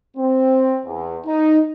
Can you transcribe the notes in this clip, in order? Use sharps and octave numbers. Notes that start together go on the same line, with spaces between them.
C4
E2
D#4